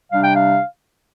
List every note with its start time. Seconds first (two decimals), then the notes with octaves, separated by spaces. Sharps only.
0.12 C3 G3 D4 F5
0.24 G5
0.36 F5